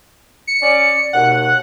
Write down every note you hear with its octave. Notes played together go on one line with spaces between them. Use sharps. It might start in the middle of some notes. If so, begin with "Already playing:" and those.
C#7
C#4 D5
D#2 B2 F#5